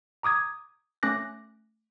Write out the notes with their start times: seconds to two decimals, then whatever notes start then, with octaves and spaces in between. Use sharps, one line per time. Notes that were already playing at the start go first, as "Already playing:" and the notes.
0.23 A#5 D6 D#6 G#6
1.03 A3 C#4 D6 F#6 A#6